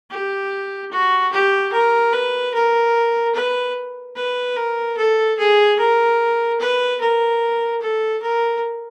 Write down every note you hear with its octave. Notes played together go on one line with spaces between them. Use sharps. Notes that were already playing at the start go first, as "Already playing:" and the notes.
G4
F#4
G4
A#4
B4
A#4
B4
B4
A#4
A4
G#4
A#4
B4
A#4
A4
A#4